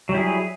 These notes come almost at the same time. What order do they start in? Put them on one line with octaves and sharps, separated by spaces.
F#3 G3 E4 G#4